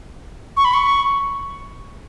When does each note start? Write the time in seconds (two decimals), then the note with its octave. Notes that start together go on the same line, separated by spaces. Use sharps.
0.57 C#6
0.65 B5
0.74 C#6